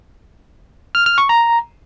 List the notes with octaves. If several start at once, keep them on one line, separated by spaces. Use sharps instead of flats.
F6
F6
C#6
A#5